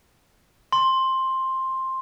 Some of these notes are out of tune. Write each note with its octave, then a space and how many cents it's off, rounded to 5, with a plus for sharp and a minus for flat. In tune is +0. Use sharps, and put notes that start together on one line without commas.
C6 +10